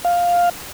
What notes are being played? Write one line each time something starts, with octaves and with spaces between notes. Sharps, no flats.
F5